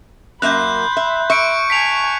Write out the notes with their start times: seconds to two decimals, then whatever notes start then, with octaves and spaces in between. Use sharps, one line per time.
0.42 F#2 A#3 E5 B5 C6 F#6 G6
0.97 E5
1.30 E5 C#6 C#7 D7
1.70 G#5 A5 B6 D7 F7